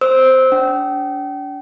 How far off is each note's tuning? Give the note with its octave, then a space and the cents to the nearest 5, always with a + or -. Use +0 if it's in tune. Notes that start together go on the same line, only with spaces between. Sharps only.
C5 +0 E6 -20
D4 -35 G5 -40